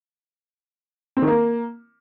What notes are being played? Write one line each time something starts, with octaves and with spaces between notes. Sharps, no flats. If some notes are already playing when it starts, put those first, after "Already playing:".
C4
D#3
A#3